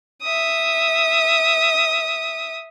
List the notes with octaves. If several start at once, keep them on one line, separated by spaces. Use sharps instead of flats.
E5 D#6